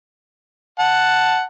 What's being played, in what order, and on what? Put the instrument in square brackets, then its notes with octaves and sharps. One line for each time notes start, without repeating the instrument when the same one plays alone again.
[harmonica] F#5 A5